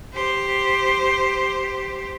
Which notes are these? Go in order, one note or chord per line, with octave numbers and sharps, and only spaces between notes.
G4 C5